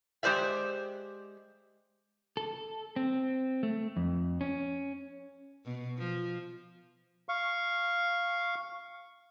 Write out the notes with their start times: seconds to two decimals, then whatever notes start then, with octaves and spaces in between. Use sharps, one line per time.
0.23 G#3 G4 C5 D5 E5
2.37 A4
2.96 C4
3.63 A3
3.97 F2
4.41 C#4
5.65 B2
5.99 F3
7.29 F5 C#6